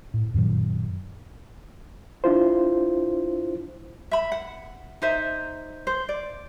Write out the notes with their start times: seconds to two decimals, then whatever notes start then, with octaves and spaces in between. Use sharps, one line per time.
0.14 A2
0.34 F#2 A#2 D#3 F#3
2.24 D4 E4 F4 C5
4.11 E5 B5
4.32 F#5
5.02 D#4 C5 E5
5.87 C5
6.09 D5